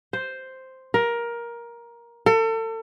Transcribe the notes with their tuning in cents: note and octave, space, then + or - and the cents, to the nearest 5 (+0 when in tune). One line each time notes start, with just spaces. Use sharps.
C5 +0
A#4 +15
A4 +35